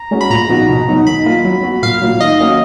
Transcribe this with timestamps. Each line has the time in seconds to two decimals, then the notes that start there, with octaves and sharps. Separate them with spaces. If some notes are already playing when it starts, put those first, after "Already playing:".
Already playing: A#5
0.11 G#3 C#4 F#4
0.21 B5
0.30 A#2 A#5
0.49 F3 B3 D#4 F#4
0.69 B2
0.88 F#3 B3 D#4 F#4
1.07 D#3 B5
1.25 A#3 F4
1.45 F#3
1.63 B3 F#4
1.82 A#2 F5
2.01 F#3 A#3 F4
2.20 D#3 D#5
2.40 A#3 C#4 F#4